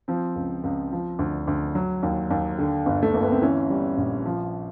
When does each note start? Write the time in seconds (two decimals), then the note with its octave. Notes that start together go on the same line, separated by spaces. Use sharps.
0.08 F3 C4
0.36 C#2
0.64 C#2
0.92 F3
1.19 D2
1.47 D2
1.75 F#3
2.03 D#2
2.30 D#2
2.58 D3
2.86 G1
3.03 A3
3.13 G1 A#3
3.23 B3
3.32 C4
3.42 E3 C#4
3.70 G3
3.97 A#1
4.25 F3